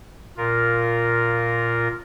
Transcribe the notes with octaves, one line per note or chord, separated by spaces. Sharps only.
A#2 F4 A#4